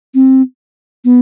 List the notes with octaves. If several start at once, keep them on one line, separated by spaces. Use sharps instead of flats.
C4
B3